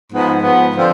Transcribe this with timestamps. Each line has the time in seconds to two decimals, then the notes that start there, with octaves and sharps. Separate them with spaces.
0.11 G#2 F3 B3
0.42 G#2 F3 B3
0.75 D3 F3 C4